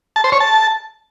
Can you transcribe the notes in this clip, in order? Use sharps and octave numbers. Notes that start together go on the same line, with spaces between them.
A5
C5
C#5
A5